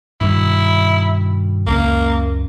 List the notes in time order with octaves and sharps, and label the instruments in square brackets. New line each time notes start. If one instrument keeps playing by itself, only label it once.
[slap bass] G2 B2 D#3 [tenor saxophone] E4
[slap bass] C#2 F#2 C#4 [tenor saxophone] A#3